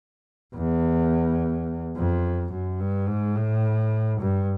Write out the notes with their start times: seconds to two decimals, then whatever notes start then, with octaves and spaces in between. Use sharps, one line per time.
0.55 E2
1.96 F2
2.52 F#2
2.80 G2
3.08 G#2
3.36 A2
4.21 G2